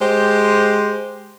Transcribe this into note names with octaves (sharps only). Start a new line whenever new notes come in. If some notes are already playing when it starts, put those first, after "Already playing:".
G#3 G4 C5